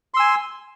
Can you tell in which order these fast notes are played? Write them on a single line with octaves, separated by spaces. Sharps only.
C6 E6 G#5